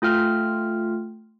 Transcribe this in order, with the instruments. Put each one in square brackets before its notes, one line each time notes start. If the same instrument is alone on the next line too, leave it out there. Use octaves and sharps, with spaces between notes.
[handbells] A3 F4 G5 F6